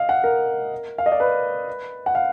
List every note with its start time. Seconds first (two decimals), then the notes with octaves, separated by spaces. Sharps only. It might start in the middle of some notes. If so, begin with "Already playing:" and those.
Already playing: D#5 F5
0.09 F#5
0.24 A#4
0.98 F5
1.06 D#5
1.12 D5
1.20 B4
2.06 F#5
2.15 F5